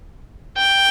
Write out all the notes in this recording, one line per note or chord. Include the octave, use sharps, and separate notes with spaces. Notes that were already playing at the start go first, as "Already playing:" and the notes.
G5